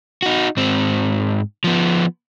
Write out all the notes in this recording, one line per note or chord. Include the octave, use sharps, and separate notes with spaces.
D#4 F#4
G#2 C4
F3 B3